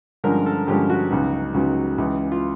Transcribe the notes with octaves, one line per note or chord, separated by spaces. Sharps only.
G2 D3 F3 G#3 C#4 A#4
A4
G2 D3 F3 G#3 C#4 G4
F#4
C#2 C#3 F#3 B3 D#4
C#2 C#3 F#3 B3 D#4
C#2 C#3 E3
F4